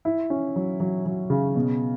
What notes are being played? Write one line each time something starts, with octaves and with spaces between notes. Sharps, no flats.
E4
C#4
F#3
F#3
F#3
C#3
B2